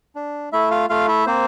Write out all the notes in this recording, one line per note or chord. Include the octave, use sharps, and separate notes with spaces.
D4
A3 E4 E5
F4 F5
A3 F4 F5
E4 E5
A#3 C4 C5